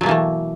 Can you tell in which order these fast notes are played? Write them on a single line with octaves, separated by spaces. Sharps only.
F#3 B2 A#3 E3 A3